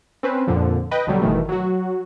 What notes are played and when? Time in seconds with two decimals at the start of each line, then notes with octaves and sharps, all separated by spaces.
0.23 C4 C#4 B4 C5
0.47 F2 A#2 D3 F3
0.91 B4 D#5 G5
1.07 B1 D3 F#3 G3
1.22 G1 B2 D#3 E3 A3
1.49 F#3 F#4